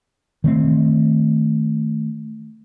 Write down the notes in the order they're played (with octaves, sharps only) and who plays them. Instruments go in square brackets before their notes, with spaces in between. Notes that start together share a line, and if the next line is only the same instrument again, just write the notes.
[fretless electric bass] D#3 A3 C4